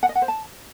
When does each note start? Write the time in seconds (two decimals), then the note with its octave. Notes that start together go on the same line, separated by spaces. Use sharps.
0.03 F#5
0.09 D#5
0.15 F#5
0.22 C5
0.28 A5